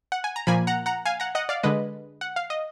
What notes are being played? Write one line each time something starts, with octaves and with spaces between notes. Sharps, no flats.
F#5
G#5
A#5
A#2 F3 A#3 G#5 B5
F#5 A#5
F#5 A#5
F5 G#5
F#5 A#5
D#5 F#5
D5 F5
D3 G#3 B4 D#5
F#5
F5
D#5